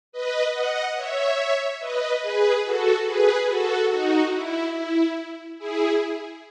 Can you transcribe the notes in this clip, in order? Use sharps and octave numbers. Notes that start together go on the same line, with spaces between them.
B4 D#5
D#5 F#5
C#5 E5
B4 D#5
G#4 B4
F#4 A4
G#4 B4
F#4 A4
D#4 F#4
E4
E4
E4 G#4